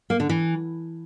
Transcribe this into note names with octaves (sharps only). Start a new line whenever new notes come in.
A#3
D3
E3